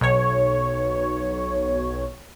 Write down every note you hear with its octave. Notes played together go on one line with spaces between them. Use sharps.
B1 C#5